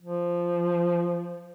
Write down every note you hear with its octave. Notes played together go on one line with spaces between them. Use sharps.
F3